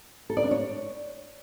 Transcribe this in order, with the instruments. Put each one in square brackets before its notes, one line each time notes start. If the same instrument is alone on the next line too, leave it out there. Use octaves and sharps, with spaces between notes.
[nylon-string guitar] A4
D5
D4
C#5